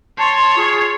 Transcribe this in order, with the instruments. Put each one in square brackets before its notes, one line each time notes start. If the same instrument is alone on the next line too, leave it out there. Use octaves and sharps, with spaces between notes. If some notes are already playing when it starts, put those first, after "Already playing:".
[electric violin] C#5 [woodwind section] A5 C6
[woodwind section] F4 G#4